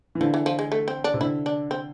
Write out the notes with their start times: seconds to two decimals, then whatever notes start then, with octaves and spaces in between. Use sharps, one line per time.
0.15 E3
0.21 D3 F3
0.34 E3
0.46 F3
0.59 G#3
0.72 A3
0.88 C4
1.04 D4
1.14 C3
1.21 D3 E4
1.46 D4
1.71 C4